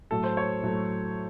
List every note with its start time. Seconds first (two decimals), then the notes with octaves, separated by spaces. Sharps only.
0.11 A2 F#3 A3 A4
0.24 C5
0.37 C#5
0.63 A2 F#3 A3